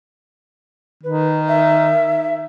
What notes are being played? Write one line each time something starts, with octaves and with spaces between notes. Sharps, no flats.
D#3 B4
E5